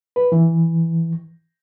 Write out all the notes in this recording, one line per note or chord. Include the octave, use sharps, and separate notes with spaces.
B4
E3